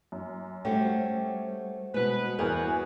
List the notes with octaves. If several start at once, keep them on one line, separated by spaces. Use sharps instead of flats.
F#2
G3 A3 C#4 F#4 G4 C5 F#5
B2 G#3 B3 B4
E2 F#4 G#4 A#4 B4 G6